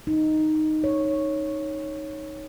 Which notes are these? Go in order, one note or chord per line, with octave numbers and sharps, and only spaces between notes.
D#4
C#5